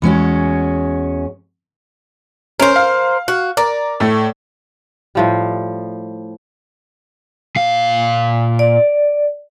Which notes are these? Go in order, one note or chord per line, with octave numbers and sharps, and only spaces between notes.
E2 G#3 C#4 F#4
C#4 A#4 C5
F5
F#4
A#4 D5
A2 A3
A2 F3 G3
A#2 F5
D5